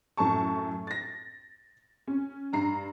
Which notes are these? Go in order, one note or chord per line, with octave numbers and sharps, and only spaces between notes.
F#2 A2 A5 C#6
A6 A#6
C#4
G2 A#5 C7